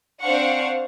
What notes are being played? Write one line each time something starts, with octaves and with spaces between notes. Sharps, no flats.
C4 D4 C5 F5 F#5 C#6